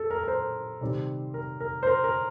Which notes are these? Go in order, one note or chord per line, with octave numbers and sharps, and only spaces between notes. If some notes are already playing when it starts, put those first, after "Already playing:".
Already playing: A4
A#4
A#4
C5
C3 D#3 G3 C4
A#4
A#4
C5
A#4
A#4